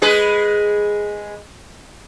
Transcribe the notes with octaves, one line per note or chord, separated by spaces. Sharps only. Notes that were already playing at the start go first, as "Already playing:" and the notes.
G#3 G#4 B4